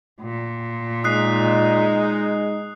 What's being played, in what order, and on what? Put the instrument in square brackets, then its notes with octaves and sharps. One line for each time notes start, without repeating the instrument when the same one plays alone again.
[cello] A#2
[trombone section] G#3 D#4 [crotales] D#6 F#6 C7